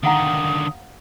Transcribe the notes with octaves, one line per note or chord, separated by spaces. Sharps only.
D3 D#3 F5 F#5 A#5 D#6